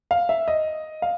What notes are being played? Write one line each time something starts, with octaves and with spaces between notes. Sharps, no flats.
F5
E5
D#5
F5